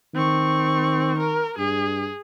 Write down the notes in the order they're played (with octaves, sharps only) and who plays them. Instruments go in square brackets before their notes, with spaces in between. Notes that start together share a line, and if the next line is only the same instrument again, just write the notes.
[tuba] D#3 [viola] C4 C#6
[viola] A#4
[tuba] G2 [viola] G#4